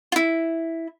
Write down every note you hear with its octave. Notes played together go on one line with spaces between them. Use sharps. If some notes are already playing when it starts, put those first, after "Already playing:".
E4 F4